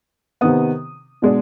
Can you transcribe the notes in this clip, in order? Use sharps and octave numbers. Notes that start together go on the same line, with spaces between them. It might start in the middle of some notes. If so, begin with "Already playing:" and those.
C3 D#3 B3 D#6
B2 G#3 D4